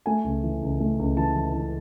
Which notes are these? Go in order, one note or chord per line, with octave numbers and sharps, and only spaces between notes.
A3 G#5
C#2
E3
C#2
A3
C#2
E3 A5
E3
E3